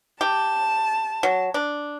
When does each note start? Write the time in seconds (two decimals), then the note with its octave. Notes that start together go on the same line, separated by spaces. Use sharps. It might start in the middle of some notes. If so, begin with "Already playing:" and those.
0.21 G4 A5
1.23 F#3
1.54 D4